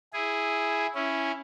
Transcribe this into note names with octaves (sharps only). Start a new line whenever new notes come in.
E4 G#4
C#4 E4